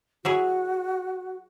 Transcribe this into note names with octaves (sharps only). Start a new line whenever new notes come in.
F#3 E4 F#4 G#4